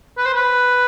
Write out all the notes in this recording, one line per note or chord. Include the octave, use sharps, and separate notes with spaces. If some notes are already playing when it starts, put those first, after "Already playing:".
B4
C5
B4